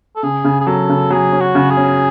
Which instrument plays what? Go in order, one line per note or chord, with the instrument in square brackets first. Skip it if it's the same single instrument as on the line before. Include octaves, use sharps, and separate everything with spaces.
[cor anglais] A4
[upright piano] C#3 [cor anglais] G#4
[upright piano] C#3
[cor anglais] G#4
[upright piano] F#3 [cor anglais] A4
[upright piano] C#3
[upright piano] F#3 [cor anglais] G#4
[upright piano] C#4
[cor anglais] F#4
[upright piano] C#3
[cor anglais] G#4
[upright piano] C#4